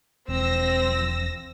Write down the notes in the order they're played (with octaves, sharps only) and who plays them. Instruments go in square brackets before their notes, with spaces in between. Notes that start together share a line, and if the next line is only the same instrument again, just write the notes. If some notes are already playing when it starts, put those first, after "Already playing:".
[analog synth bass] E1 [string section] F3 E6 A#6 [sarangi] C4